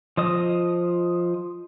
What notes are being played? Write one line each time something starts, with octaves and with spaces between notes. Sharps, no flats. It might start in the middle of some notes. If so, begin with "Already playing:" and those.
F3 D#5 D#6